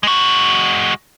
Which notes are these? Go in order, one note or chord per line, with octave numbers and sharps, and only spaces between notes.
G#3 F#4